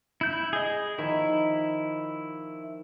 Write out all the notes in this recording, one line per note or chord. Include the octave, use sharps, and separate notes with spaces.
E4 G6
G#4 D#5
D#3 F3 E4